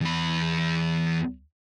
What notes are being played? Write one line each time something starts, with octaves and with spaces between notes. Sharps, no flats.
E2 B5